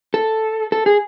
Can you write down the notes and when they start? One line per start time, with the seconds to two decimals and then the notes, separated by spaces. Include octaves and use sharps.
0.14 A4
0.72 A4
0.86 G#4